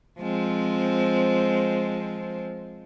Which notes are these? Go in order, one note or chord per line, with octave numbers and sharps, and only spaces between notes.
F3 G#3 C4